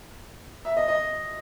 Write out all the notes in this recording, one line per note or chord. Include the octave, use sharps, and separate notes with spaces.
E5
D#5
D#5